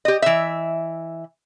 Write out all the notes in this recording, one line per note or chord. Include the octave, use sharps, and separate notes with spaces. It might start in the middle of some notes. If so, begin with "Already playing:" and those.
G4 D#5
E3 E5